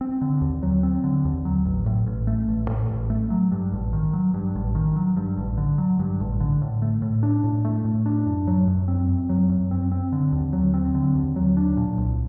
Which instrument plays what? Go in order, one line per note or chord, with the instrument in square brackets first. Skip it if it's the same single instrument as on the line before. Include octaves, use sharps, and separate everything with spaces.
[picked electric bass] C4
D3
D#2
F#3
C4
D3
D#2
F#3
A1
A2
A1
A3
A1
A2
A1
A3
F#3
G2
A1
D#3
F#3
G2
A1
D#3
F#3
G2
A1
D3
F#3
G2
A1
D3
A2
A3
A2
D4
A2
A3
A2
D4
F#2
F#3
F#2
C4
F#2
F#3
F#2
C4
C4
D3
D#2
F#3
C4
D3
D#2
F#3
D4
A#2
C2